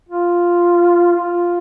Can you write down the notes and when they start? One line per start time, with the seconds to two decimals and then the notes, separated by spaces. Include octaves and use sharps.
0.09 F4
1.16 F4